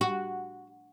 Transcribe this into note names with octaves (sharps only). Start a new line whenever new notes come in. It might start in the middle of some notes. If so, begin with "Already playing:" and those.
F#4